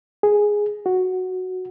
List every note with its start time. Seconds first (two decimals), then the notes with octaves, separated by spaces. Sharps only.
0.23 G#4
0.86 F#4